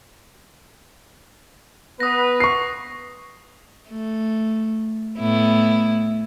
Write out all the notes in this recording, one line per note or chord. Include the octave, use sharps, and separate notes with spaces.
B3 B4 D#6 A#6
C#6 C7
A3
A2 B3 E4